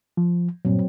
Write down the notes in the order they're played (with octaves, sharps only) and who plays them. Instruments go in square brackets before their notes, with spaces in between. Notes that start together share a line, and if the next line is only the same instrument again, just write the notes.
[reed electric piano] F3
[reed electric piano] G2 A#2 [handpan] F#3 C4